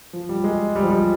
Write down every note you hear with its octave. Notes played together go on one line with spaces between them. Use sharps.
F3
G3
G#3
G3
F3
G3